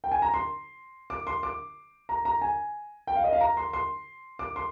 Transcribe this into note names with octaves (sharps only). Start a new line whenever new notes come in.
G5
G#5
A#5
C6
D6
C6
D6
A#5
A#5
G#5
G5
F5
D#5
F5
A#5
C6
C6
D6
C6